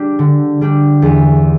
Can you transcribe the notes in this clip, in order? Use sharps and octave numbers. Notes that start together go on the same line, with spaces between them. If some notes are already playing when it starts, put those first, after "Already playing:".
Already playing: G3 D4 G4
D3
G3 D4 G4
E2